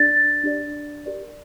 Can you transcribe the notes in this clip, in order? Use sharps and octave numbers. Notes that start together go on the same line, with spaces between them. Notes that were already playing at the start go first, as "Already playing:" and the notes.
Already playing: D4 G4 D5 A6
D4 G4 D5
G4 A#4 D5